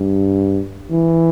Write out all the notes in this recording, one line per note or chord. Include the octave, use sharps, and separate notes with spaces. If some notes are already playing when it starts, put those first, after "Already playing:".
Already playing: G2
E3